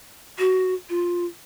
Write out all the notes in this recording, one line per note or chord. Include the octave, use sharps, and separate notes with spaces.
F#4
F4